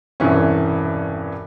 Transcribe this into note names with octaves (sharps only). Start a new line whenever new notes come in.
E1 G2 C3 E3 C#4